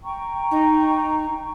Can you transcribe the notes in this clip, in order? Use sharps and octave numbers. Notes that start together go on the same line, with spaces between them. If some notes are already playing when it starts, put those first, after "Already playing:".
G5 A#5 C#6
D#4